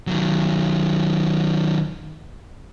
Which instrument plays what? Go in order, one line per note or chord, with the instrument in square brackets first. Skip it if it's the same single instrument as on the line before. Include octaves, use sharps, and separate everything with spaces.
[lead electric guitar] D#3 F#3